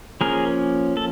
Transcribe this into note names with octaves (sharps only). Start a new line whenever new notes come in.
F3 A#3 C#4 G#4 A#4
A4